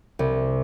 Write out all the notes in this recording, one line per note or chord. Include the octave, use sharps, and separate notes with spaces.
C2